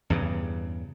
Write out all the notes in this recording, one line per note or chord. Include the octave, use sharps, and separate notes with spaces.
E2 G2 C#3